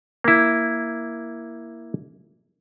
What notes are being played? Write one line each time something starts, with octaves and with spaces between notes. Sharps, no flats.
A#3 E4